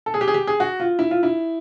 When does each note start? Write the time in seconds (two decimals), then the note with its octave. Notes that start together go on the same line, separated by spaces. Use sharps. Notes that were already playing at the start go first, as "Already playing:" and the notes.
0.06 A4
0.14 G#4
0.21 G4
0.28 G#4
0.34 G4
0.47 G#4
0.60 F#4
0.80 F4
0.99 E4
1.11 F4
1.23 E4